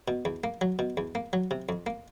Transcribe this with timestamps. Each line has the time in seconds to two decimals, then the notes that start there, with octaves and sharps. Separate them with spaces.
0.08 B2
0.25 E2
0.44 A#3
0.61 F#3
0.79 B2
0.97 E2
1.15 A#3
1.33 F#3
1.51 C3
1.69 F2
1.86 A#3